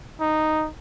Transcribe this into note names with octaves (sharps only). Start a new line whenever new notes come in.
D#4